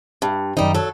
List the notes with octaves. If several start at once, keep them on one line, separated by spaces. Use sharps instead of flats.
G2
F#2 D#3 G3 D#4
F#3 A4